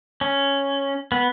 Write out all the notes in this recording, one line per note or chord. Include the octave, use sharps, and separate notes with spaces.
C#4
B3